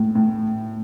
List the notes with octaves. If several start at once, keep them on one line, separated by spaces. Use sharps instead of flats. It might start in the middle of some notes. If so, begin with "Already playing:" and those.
Already playing: A2
A2